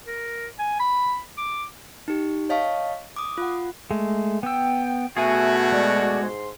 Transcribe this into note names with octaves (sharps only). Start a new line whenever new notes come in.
A#4
G#5
B5
D6
D#4 G4
C#5 D#5 F5 A5 C#6
D6 D#6
F4 F#5
G#3 A3
B3 G5 E6
B2 A3 F#4 G#4 E5 G#5
G#3 D5
G#2 C6